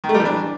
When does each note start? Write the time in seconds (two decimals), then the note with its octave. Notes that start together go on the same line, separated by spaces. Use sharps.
0.04 D#3
0.09 A3
0.14 G3
0.20 E3
0.25 D4